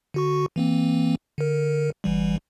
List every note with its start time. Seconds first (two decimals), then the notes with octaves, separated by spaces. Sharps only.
0.14 D3 F#4 C#6
0.56 E3 A#3 C4
1.38 D3 A#4
2.04 G1 E3 G3